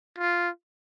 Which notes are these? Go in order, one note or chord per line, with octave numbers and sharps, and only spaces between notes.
F4